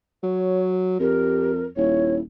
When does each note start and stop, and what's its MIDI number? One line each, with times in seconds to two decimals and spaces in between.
0.23 0.95 54
0.23 0.71 73
1.00 1.67 41
1.00 1.51 67
1.00 1.64 70
1.76 2.21 27
1.76 2.21 64
1.76 2.14 73